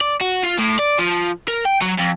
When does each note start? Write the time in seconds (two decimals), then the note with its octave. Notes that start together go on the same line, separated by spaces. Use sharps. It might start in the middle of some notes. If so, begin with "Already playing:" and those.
0.01 D5
0.21 F#4
0.44 F4
0.59 A2
0.79 D5
0.99 F3
1.48 A#4
1.65 G5
1.82 F#3
1.99 F2